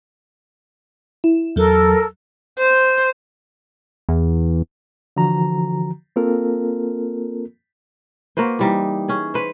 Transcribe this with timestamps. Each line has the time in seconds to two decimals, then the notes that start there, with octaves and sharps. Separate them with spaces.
1.24 E4
1.56 E2 F#3 A4 A#4
2.58 C5
4.09 E2
5.17 D3 E3 F3 F#4 A#5
6.16 A#3 C4 F4 A4 A#4
8.37 A#3 F#4 B4 C5
8.59 E3 G3 D#4
9.08 C#4 G#4
9.34 B4 C5